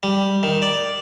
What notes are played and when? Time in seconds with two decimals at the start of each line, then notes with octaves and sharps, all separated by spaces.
0.03 G3
0.43 D#3
0.62 D5